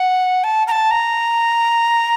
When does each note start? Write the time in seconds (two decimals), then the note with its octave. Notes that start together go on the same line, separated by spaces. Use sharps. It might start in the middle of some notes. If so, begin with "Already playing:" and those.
Already playing: F#5
0.44 A5
0.68 A#5
0.71 A5
0.91 A#5